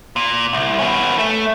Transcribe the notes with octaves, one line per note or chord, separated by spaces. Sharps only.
A#2
C2
B3 C#4
A3